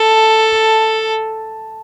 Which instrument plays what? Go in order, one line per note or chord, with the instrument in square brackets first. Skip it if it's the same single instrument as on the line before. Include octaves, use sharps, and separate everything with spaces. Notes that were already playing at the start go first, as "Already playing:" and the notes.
Already playing: [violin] A4 [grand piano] A5